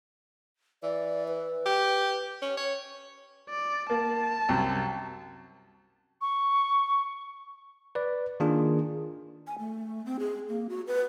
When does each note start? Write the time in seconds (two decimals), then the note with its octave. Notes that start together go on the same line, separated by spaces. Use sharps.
0.83 E3 D5
1.28 B4
1.66 G4
2.42 C#4
2.57 C#5
3.50 D5
3.90 A#3 A5
4.49 C2 F#2
6.21 C#6
7.95 B4 D5
8.40 D#3 A#3 D4 F4 G#4
9.47 G#5
9.59 A3
10.06 C4
10.20 G#4
10.49 A#3
10.69 F#4
10.87 B4